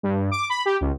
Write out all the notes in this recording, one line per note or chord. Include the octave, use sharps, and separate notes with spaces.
G2
D6
B5
G4
C#2